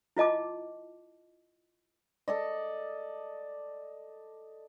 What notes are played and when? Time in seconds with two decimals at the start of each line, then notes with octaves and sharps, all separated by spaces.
0.17 E4 F4 D#5 A5 D6
2.28 A4 D5 D#5